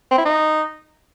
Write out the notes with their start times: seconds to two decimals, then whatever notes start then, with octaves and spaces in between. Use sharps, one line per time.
0.11 C4
0.18 E4
0.25 D#4